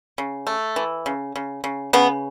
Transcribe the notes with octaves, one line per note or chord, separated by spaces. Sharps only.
C#3
A3
E3
C#3
C#3
C#3
C#3 B3